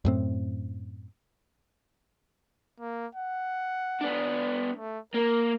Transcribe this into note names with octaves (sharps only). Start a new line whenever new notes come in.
F#2 A2 C4
A#3
F#5
B3 D4
A3
A#3 A#4